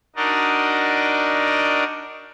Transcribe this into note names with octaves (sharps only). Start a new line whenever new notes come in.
D4 D#4 F#4 A#4 D5 D#5